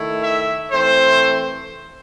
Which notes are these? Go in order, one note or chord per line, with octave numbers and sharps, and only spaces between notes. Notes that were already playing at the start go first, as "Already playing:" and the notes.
Already playing: D#3 A3 E4
E5
E3 A3 C4 C5